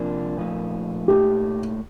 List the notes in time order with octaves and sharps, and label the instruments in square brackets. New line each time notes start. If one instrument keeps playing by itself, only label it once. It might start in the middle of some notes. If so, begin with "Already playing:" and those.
Already playing: [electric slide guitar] C3 F3 A#3 D4
A#2 F3 A3 D#4
[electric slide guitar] A#2 A3 D#4 [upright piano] G4